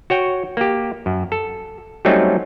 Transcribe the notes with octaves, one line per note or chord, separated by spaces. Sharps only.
F#4 C#5 G5
A#3 G4
F#2
A4
F#3 G3 A3 C4 C#4 D#4